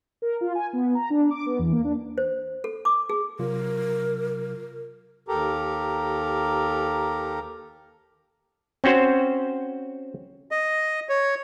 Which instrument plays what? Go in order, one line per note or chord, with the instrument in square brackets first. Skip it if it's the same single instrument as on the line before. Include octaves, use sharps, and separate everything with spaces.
[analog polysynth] A#4
F4
G#5
B3
A#5
D4
D6
B3
E2
A#3
D4
[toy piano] C5
A4
D6
G#4
[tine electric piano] C3 F#3 F4 [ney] A#4
[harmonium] D#2 G4 A4 A#4 A#5
[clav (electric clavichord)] C4 C#4 F#4 C5
[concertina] D#5
C#5